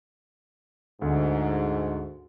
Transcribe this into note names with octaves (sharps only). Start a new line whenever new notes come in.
D2 G#2